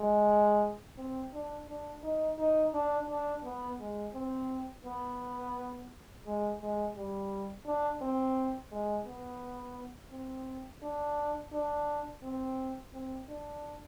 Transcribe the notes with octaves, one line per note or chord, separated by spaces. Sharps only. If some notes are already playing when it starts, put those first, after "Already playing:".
Already playing: G#3
C4
D4
D4
D#4
D#4
D4
D4
B3
G#3
C4
B3
G#3
G#3
G3
D4
C4
G#3
B3
C4
D4
D4
C4
C4
D4